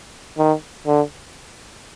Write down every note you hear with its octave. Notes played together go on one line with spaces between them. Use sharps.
D#3
D3